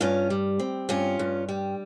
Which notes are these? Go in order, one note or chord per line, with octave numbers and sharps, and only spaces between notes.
G2 C#4 F4
G3
C4
G2 C#4 F4
G2
G3